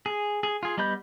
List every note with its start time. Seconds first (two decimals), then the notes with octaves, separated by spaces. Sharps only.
0.06 G#4
0.43 G#4
0.63 F4 G#4
0.77 G3 B3 D#5 B5 G6